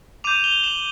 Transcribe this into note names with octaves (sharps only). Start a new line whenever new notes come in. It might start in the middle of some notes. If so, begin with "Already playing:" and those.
D6 G6 D#7 F7
F7 G7
E7 F#7